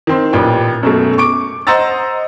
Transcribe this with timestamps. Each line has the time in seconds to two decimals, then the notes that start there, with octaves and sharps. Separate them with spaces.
0.07 D#3 C4 C5
0.33 A1 A#2 G4 B4 G5
0.83 F#2 B2 A3
1.18 C#6 D6 D7
1.67 C5 D#5 F#5 A#5 E6 A6